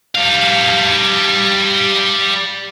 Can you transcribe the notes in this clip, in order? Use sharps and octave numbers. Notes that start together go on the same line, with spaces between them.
G3 F5